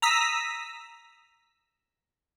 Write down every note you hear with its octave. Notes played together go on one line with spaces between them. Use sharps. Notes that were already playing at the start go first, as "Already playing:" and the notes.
A#5 D#6 E6 B6